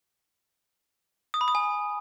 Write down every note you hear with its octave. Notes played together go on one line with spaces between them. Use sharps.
D#6
B5
D#6
G#5